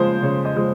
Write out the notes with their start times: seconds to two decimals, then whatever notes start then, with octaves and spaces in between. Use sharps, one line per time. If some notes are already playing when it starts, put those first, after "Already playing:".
Already playing: C#3 F3 G#3 C5
0.22 C#3 C#5
0.45 D#5
0.56 F3 G#3